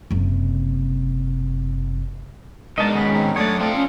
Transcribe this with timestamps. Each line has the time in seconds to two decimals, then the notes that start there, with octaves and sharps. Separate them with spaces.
0.11 F#1 C3
2.78 G#2 B2 G#3 D4 D#4 A#4 D#5 A5
2.95 D#3 B3 C#4 D#5 G#5 B5
3.14 C4 D#4
3.36 F#2 A3 D4 C#5 D5 D#6
3.59 F3 A3 C4 D4 F4 A4 D5
3.75 C#4